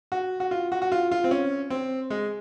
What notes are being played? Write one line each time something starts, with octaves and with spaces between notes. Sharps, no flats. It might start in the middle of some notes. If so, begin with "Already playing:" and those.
F#4
F#4
F4
F#4
F#4
F4
F4
C4
C#4
C4
G#3